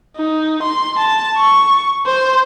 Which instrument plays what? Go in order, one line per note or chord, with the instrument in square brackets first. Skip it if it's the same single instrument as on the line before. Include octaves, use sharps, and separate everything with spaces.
[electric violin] D#4
C6
A5
C#6
C5